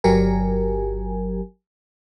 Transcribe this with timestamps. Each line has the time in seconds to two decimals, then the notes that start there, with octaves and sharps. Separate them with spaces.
0.04 G1 F#3 G4 A#4 G#5